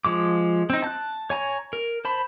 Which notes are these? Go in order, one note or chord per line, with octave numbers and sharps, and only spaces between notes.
F3 G#3 D6
C4 D#4
A5 F#6
C#5 G#5 A#5
A#4
C5 A5 B5